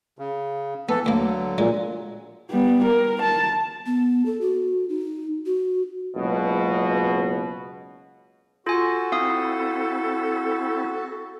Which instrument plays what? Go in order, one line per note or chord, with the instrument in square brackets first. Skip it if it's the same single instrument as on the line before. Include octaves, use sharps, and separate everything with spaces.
[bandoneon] C#3
[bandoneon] E3 A4 [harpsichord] B3
[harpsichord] D2 A#3 [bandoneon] D3 F#3
[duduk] A#2 [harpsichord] G#3
[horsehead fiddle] G3 B3
A#4
A5
[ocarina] B3
A4
F#4
D#4
F#4
[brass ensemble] F#1 C#2 B2
[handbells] F4 G#5 [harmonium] F#4 [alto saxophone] A4
[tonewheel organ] C4 E4 [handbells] F5 D#6